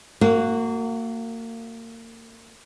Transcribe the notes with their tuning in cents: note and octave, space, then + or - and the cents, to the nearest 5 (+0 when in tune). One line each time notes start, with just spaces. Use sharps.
A#3 -30 F#4 +0